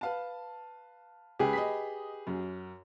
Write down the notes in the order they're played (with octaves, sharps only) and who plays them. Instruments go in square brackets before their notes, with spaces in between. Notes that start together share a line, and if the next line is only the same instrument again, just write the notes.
[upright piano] B4 F5 A5
[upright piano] C#2 [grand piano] G4 G#4 B4
[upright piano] D#5 B5 B6
F#2